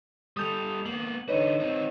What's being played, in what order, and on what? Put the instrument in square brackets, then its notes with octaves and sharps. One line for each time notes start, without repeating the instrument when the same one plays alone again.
[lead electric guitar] G3 A4 [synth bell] D#6 G6 F7
[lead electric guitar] A#3 B3 [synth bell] F#7
[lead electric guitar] D3 D#4 [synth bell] B4 C#5
[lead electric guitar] C4 D#4